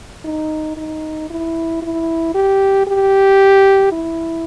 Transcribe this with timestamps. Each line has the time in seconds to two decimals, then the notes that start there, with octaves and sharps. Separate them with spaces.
0.25 D#4
0.77 D#4
1.30 E4
1.82 E4
2.35 G4
2.87 G4
3.92 E4